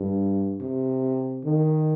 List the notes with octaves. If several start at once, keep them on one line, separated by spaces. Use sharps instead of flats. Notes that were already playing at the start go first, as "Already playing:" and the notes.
Already playing: G2
C3
D#3